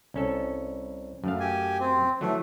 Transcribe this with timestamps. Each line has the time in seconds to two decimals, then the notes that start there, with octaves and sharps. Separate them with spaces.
0.14 C2 C#4 A4
1.24 F#2 A3 F5
1.40 G4 G#5
1.80 C4
2.21 E3 F#3 A3